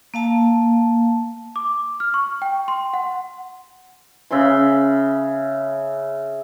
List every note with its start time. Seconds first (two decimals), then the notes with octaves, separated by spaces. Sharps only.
0.14 A#3 F5 A5
1.56 D6
2.00 F6
2.14 C#6
2.42 G5
2.68 C6
2.94 F#5
4.31 C#3 E5 B5 C6